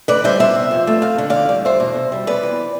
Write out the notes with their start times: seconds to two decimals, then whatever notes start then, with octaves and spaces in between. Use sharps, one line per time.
0.08 D2 B4 D5
0.24 G3 C5 E5
0.39 B3 C5 E5
0.55 C3
0.71 F2
0.87 A3
1.02 C4 F5
1.18 D3
1.30 E2 D5 F5
1.49 G3
1.65 E2 C5 E5
1.80 B2
1.96 C3
2.12 G3
2.27 B3 B4 D5
2.43 E3